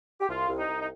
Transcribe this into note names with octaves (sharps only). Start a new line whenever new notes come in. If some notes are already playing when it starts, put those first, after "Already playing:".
G4
C2 F4
C2
D#4
C2
D#4